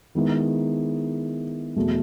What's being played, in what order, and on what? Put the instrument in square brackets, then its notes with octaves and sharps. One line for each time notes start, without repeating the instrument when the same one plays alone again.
[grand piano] D#3 G#3 B3 E4
E2 B2 F#3 A3